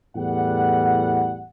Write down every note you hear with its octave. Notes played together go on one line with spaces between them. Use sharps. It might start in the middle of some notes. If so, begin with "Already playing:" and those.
E2 A2 G3 F#5